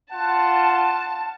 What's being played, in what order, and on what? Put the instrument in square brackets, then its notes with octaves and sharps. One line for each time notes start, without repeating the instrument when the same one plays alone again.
[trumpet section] F4 F#5 [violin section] A5